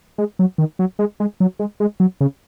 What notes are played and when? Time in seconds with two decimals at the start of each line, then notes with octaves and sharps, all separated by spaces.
0.18 G#3
0.39 F#3
0.58 D#3
0.79 F#3
0.99 G#3
1.20 G#3
1.40 F#3
1.59 G#3
1.80 G#3
2.00 F#3
2.21 C#3